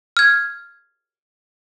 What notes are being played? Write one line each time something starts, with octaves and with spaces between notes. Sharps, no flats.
F6 G#6